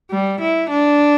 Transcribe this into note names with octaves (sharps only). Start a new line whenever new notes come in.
G3
E4
D4